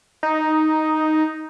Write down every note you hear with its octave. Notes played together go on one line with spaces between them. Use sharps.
D#4